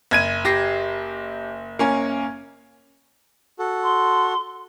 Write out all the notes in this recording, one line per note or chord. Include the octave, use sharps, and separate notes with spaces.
F#1 G#6 D#7
G4 A#6 C7
A#3 C#4 G#5
F#4 A4
C6